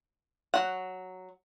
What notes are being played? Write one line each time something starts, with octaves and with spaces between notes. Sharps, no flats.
F#3 F#5